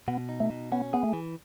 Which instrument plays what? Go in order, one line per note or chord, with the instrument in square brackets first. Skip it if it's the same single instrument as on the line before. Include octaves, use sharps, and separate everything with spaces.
[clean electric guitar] B2 [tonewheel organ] B3
[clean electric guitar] D#4
[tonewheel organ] A3
[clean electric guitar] B2
[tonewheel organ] B3 [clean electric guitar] C#4
[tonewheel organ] B3 [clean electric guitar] G#4
[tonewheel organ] A3
[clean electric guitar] E3